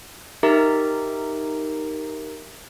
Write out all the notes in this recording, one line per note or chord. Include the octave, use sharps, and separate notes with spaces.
D#4 G4 A#4 E5 A#5